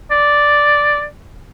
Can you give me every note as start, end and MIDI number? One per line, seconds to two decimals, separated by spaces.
0.11 1.05 74